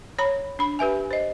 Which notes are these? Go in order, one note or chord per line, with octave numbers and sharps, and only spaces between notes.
C#5 A#5 B5
D4 B5
G4 B4 E5 G#5
C5 D#5